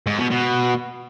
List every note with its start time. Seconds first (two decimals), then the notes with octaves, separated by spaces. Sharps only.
0.07 G#2
0.18 B2
0.30 B2